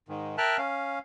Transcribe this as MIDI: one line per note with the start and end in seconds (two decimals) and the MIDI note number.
0.09 0.36 44
0.09 0.36 51
0.38 0.57 70
0.38 0.57 76
0.38 0.57 79
0.38 0.57 81
0.38 0.57 89
0.38 0.57 90
0.58 0.99 61
0.58 0.99 77